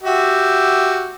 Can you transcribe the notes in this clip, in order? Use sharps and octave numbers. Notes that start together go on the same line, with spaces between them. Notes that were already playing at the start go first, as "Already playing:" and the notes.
F#4 G4 E5